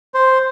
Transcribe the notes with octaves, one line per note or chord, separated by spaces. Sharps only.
C5